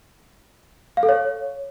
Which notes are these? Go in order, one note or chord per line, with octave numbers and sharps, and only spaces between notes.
F5
A4
C#5